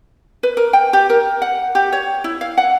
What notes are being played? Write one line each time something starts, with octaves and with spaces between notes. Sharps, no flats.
B4
A#4
G5
G4
A#4
F#5
G4
C#5
E4
F5
F#5